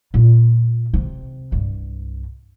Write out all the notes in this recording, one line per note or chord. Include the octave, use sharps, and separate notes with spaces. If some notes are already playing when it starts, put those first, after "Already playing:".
A#2 F4
C3
C2 G2